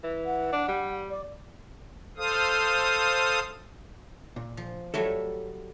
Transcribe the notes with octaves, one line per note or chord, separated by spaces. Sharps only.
E3
F#5
D4
G3
D5
A4 C5 F5 D#6
A#2
F3
F#3 G3 A3 A4 C#5 E5